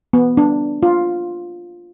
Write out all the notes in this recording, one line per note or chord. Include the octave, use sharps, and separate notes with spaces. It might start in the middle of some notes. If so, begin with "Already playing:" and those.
B3
D4
F4